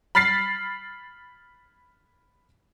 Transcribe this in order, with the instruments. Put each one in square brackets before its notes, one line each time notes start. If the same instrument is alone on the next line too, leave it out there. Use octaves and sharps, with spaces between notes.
[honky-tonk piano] B5 F6 A6 B6 C7